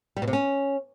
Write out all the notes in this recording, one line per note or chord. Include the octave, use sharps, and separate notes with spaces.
G3
B2
C3
C#4